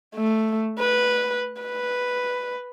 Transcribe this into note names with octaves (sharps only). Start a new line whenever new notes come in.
A3
B4
B4